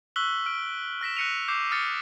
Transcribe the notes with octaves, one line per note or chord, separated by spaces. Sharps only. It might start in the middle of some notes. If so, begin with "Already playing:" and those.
C#6 E6 F#6 B6 F#7 G7
F6 D7
F6 A#6 B6 E7
F#6 A#6 C#7 D#7 F7
D6 G6 C7 E7
D#6 F6 A6 A#6 C#7